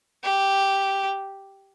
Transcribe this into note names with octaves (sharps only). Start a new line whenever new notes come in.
G4